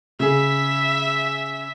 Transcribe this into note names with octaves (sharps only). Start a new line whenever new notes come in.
C#3 G#4 E5 B6